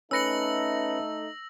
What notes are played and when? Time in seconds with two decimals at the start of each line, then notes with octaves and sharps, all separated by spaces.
0.11 A3 C#4 D#4 B4 E6 A#6 C#7 F#7